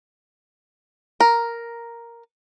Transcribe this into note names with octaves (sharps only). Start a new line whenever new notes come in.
A#4